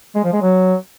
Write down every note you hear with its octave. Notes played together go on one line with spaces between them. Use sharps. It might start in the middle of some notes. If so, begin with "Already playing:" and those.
G#3
F3
G#3
F#3